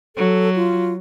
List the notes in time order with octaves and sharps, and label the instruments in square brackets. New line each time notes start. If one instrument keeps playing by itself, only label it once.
[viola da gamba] F#3 [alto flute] A4
[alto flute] F4